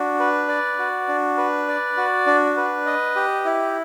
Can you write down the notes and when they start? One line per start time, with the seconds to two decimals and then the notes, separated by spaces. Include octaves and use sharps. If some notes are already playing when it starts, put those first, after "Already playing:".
Already playing: D4 F#4
0.20 B4
0.48 D5
0.79 F#4
1.08 D4
1.38 B4
1.68 D5
1.97 F#4
2.26 D4
2.57 B4
2.86 D#5
3.16 G4
3.45 E4